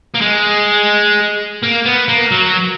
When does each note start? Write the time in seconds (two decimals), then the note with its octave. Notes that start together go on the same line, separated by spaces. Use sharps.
0.15 A#3
0.22 G#3
1.63 A#3
1.86 B3
2.08 A#3
2.32 F#3